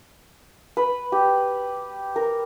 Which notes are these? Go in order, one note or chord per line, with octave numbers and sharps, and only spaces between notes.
B4
G4
A#4